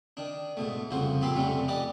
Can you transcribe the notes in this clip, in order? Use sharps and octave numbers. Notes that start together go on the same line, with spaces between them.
D#3 D4
G#2 B2 A3
C2 F2 C#3 F#4 C5
A#2 C4 G4 A4 B5 C6
F2 C3 G3 A3 C#4
G4 B4 D5 D#5